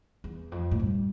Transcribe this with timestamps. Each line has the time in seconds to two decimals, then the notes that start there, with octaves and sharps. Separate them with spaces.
0.24 E2
0.52 F2
0.71 A2
0.80 G2